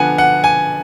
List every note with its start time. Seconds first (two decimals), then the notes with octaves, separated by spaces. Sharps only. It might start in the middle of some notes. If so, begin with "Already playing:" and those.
Already playing: D3 F3 B3 F#5 G#5
0.18 F#5
0.44 G#5